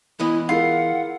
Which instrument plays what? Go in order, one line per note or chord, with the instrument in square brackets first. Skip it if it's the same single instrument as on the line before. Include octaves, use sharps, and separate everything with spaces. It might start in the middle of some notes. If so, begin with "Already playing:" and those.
[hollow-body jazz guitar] E3 B3 D#5 [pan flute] E4
[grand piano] E4 G#4 A#4 [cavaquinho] F4 [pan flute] F#5